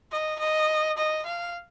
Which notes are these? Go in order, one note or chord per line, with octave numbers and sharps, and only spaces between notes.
D#5
D#5
D#5
F5